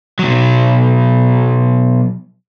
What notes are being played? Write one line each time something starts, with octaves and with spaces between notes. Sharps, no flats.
B2 F#3